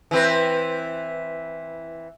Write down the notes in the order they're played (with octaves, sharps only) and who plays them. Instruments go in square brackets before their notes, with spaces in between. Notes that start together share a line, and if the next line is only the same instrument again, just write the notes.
[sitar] E3 C4 B4